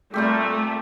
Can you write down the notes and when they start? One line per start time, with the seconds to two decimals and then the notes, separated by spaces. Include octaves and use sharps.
0.14 A#2 G3 A3 C4 G4